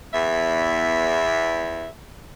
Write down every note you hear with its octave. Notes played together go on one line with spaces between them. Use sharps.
E2 E5